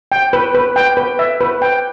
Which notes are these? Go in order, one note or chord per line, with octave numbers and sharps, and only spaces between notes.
G5
B4
B4
G5
B4
E5
B4
G5